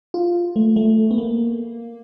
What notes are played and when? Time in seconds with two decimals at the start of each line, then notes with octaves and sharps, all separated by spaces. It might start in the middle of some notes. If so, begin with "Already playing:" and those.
0.14 F4
0.56 A3
0.76 A3
1.11 B3
1.18 A#3